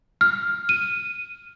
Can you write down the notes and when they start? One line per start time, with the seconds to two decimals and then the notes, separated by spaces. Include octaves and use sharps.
0.21 F6
0.69 D#7